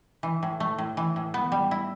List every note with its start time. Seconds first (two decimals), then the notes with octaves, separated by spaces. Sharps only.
0.23 E3
0.43 A2
0.60 A3
0.78 A2
0.97 E3
1.16 A2
1.34 B3
1.52 G3
1.71 E4